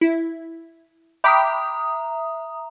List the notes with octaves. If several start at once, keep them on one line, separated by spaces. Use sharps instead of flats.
E4
E5 G5 A#5 B5 D6 D#6